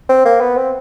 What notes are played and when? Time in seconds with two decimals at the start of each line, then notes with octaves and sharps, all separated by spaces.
0.09 C4
0.26 A#3
0.41 B3
0.57 C4